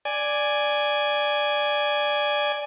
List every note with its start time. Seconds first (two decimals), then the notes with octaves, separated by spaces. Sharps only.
0.05 D5 G#5